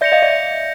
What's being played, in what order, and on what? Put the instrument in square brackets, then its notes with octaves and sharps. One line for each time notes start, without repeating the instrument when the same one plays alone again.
[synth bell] D5 E5 [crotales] G6 A#6 C#7 F7
[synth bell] D#5 F5
D5 E5